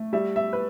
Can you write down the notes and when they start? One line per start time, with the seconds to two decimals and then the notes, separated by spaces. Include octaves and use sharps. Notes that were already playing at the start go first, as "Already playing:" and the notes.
Already playing: A3
0.13 G3 E5
0.36 E5
0.53 B4